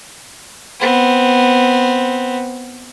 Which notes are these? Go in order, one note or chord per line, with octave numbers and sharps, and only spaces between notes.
B3 C4